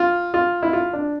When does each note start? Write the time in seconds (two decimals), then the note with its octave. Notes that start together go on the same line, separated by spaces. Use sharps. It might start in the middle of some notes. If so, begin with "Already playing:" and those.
Already playing: F4
0.34 F4
0.63 E4
0.73 F4
0.93 D4